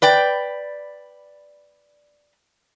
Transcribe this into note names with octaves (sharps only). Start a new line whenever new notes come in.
B4 D5 G5